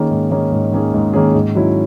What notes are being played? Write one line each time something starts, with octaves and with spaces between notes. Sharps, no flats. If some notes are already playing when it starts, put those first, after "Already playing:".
Already playing: D#3 A#3 C#4 G#4
G#2
D#3 A#3 C#4 G#4
G#2
D#3 A#3 C#4 G#4
G#2
D#3 A#3 C#4 G#4
G#2
D#3 F#3 C#4 E4